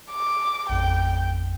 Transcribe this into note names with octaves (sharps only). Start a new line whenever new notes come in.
D6
A1 F2 G5